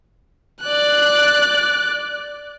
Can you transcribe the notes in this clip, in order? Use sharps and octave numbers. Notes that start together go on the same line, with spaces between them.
D5 F#6